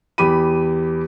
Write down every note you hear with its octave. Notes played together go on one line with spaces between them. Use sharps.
E2 G4 B5 D#7